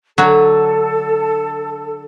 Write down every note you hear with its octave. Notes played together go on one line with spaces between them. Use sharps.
D3 F#3 F#4 A4